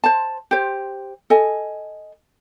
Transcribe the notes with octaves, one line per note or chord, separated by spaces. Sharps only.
C5 A5
G4 C5
A4 D#5 G#5